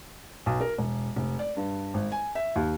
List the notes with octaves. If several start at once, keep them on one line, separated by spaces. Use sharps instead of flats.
B1
A#4
E1
F1
D5
G2
G#1
G#5
E5
D#2